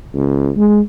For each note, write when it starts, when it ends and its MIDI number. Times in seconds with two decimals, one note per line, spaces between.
0.15 0.49 37
0.57 0.80 56